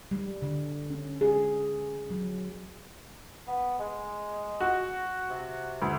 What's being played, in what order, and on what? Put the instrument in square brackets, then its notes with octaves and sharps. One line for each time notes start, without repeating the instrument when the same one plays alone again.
[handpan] G3
D3
C#4
G#4
F#3
[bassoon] B3
G#3
[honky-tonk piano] F#4
[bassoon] C3
[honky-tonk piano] D2